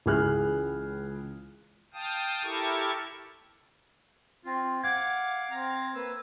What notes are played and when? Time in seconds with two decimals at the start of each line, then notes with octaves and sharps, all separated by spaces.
0.06 C#2 E3 G#4 F6 F#6
1.94 F5 G5 A5 D#6
2.43 E4 G4 A4 A#4 A5 C#6
4.45 C4 F4
4.84 F5 F#5 D6 G#6
5.51 C4 F5 A#5
5.95 A#3 B4 E6